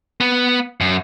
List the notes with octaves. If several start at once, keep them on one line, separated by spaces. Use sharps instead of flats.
B3
F#2